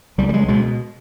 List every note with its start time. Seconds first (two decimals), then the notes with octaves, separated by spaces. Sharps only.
0.18 C#2 G3
0.29 G3
0.34 G#3
0.48 B2 G#3